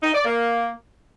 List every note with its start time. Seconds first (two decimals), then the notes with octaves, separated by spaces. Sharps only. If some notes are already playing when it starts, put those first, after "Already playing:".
0.03 D#4
0.14 D5
0.25 A#3